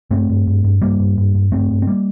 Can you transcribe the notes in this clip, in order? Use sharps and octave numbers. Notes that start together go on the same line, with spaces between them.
G2 A3 C4
G2
G2
G2
G2 G3 A#3
G2
G2
G2
G2 A3 C4
G2
C4
G3 A#3